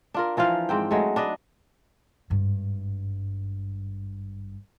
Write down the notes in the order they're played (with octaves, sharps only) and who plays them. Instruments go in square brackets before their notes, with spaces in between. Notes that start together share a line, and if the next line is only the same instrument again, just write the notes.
[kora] D4 F4 A#4
E3 F3 F4 F5
G#2 C4 G5
F#3 G#3 A3
D4 B4 D#5
[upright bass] G#1 G2